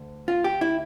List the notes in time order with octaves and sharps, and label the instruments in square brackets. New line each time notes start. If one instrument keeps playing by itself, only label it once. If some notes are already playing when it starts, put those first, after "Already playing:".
Already playing: [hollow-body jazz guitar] D2 D3
F4
G4
E4